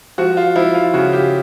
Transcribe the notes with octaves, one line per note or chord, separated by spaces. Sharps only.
F3 F#4
F4
F3 E4
F4
C#3 F#4
G4